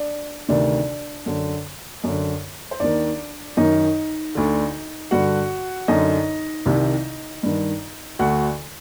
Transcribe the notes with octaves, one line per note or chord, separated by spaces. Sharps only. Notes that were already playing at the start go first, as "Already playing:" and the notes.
Already playing: D4 D5
D2 C3 D#3 D4 D5
F#2 D3
F#2 D3
C5
D#2 D#3 D4 D5
F#2 D#3 D#4 D#5
D2 D3
G2 D3 F#4 F#5
F#2 D3 D#4 D#5
C2 C3 D#3
G2 D#3
D2 D3 F#4 F#5